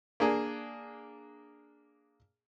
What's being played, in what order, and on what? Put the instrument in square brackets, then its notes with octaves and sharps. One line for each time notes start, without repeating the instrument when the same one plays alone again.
[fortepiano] A#3 D4 G#4